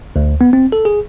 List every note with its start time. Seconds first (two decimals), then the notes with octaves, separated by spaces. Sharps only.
0.16 D2
0.41 B3
0.53 C4
0.72 A4
0.85 G#4